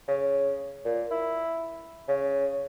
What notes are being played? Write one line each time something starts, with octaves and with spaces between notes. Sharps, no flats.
C#3
A#2
E4
C#3